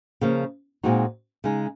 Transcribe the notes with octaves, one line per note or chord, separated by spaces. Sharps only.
C#3 F3 A#3
A#2 G#3 C4 D#4 F#4
C#3 G#3 D#4